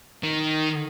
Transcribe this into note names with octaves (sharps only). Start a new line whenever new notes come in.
D#3